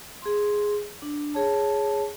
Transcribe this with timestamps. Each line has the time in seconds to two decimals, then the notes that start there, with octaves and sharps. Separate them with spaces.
0.22 G#4 C6
1.02 D4
1.34 G#4 C#5 A5